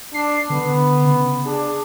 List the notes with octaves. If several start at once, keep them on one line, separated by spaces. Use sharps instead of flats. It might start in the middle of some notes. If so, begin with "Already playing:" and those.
D4 C7
D3 B3
C#3
D4 G#4